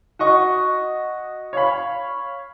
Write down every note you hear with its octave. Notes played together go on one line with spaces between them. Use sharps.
F#4 D#5 C#6
C#5 F5 B5